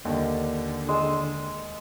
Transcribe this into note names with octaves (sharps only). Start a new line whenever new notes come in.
D#2 D3
G#3 E6